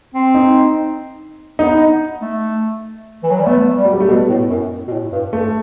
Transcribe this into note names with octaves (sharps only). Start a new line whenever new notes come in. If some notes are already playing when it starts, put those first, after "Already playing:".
C4
D#4
B3 D#4
A3
E3
F#3
G3
A3 B3
G3
F#3
G3
A3
B2 B3
A2
F#2
B2
A2
G2
G2 A3